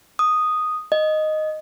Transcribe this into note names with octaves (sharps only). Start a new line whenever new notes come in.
D#6
D#5